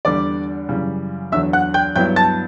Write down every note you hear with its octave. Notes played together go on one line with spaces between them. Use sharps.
E2 D3 G3 D5 D6
F#2 C#3 E3 G3
E2 D3 F#3 E5 E6
F#5 F#6
G5 G6
G2 F#3 B3 E4 G5 G6
A5 A6